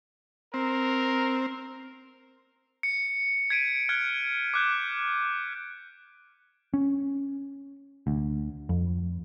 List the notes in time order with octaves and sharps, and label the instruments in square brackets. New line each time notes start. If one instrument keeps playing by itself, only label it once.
[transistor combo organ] C4 [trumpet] A#4
[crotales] C#7
G#6 B6 D7 D#7
F6 F#6 G#6
D6 F#6 G6
[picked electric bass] C#4
D2
F2